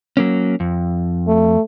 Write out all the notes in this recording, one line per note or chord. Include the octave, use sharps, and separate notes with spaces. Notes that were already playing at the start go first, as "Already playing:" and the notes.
F#3 A#3 C#4
F2
A3